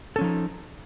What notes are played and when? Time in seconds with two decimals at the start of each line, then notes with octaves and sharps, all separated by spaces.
0.16 A4
0.19 C#4
0.21 F3
0.24 D#4